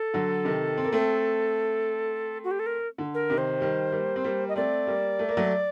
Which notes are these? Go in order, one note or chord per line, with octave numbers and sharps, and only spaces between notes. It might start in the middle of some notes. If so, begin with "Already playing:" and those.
Already playing: A4
D3 F#3
C3 D#3
C4
A#3
A3 C4
F#4
G4
A4
A#4
D3
A#4
C3 D#3
C5
D#3 G3
G3 A#3
C4
G3 A#3
D#5
A3 C4 D5
G3 A#3
A3
A#3
F#3 A3